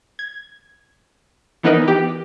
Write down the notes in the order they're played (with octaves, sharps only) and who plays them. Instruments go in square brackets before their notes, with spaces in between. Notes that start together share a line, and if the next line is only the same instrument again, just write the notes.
[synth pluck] G#6
E3 B3 D#4 A#4 B4 D#5
G4